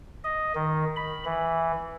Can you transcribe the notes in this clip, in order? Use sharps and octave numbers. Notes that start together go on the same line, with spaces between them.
D#5
D#3
B5
E3